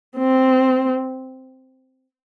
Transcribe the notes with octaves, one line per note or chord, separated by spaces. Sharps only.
C4